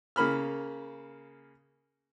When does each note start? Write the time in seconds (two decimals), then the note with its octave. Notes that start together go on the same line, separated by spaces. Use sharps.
0.16 C#3 A#3 B5 F6